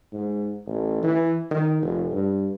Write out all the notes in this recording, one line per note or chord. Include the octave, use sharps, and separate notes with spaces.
G#2
A1
E3
D#3
F1
G2